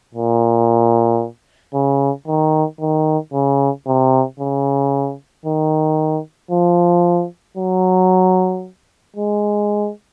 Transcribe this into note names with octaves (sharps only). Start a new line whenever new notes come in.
A#2
C#3
D#3
D#3
C#3
C3
C#3
D#3
F3
F#3
G#3